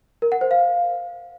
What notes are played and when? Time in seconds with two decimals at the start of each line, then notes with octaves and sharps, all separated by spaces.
0.22 A#4
0.32 F#5
0.41 C5
0.51 F5